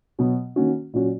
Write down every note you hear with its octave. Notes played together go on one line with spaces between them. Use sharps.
B2 F#3 B3
D#3 A#3 C#4 F#4
A#2 F#3 C#4 F#4